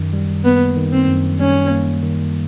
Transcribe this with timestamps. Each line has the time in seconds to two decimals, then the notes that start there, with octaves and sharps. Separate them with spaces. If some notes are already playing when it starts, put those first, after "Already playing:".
Already playing: F#2 D#3
0.13 G3
0.44 A#3 B3
0.76 D#3
0.92 C4
1.08 F#2
1.39 G3 C#4
1.70 A#3
2.03 D#3